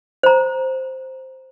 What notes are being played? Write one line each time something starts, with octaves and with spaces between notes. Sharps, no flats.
C5 A#5